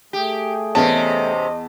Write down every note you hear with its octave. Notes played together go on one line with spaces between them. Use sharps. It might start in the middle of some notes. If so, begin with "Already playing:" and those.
A3 G4 G#4
E2 C3 C#4 D#5 A5